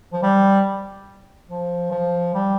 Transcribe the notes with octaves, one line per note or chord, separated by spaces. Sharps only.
F3
G3
F3
F3
G3